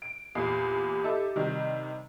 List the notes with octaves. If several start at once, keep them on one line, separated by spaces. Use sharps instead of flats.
D7
E2 A#2 G4 C7
D#4 A4 E5
C3 D#3 G3